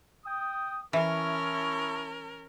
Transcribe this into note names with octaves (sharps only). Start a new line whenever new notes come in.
G5 D#6
E3 C#4 E4 A#4 A5 C#6